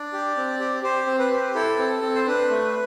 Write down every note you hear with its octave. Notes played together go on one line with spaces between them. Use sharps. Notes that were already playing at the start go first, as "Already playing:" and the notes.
Already playing: D4 D5
G4
C4
G4
G4 C5
C4
B4
G4
E4 A4
C4
C4
C5
D4 B4
A3